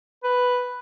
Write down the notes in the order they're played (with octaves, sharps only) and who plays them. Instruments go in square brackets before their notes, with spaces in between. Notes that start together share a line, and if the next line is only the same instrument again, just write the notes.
[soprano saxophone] B4